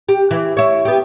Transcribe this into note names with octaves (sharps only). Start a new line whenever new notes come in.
G4
E3
E4 C#5
B3 G4